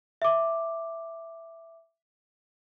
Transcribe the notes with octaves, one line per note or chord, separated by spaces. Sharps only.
E5 D6